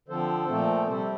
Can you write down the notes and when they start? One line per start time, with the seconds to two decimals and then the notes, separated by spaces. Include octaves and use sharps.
0.08 D3 F3 C4 A4 C5
0.48 A#2 F3 A3 C4
0.88 C3 G3 C4 A4 C5